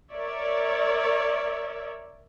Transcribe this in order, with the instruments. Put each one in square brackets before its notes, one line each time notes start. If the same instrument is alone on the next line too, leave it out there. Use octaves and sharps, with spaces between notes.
[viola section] A#4 C#5 D5 E5